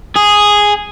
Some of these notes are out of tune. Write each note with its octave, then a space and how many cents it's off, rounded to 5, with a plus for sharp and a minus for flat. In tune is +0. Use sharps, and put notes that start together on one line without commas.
G#4 -5